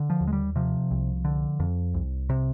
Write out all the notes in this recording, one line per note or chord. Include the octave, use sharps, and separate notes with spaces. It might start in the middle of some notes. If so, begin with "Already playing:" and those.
Already playing: D3
F3
D#2
G#3
G3
C3 F3
C2
D3
F2
C2
C3